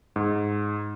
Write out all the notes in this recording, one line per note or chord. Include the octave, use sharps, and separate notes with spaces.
G#2